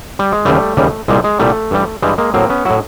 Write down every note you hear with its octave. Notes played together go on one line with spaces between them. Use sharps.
G3
G#3
D#2 C#3 E3 G3 A3
D#2 C#3 E3 G3
C2 A#2 G3 G#3
G#3
C2 A#2 G3 A3
G2 E3 G3
G2 E3 G3 G#3
G#3 A#3
A2 F#3 A#3 C4
B3 C#4
A2 F#3 E4 F#4